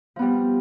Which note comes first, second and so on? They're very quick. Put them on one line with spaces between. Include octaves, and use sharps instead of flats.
F3 B3 G3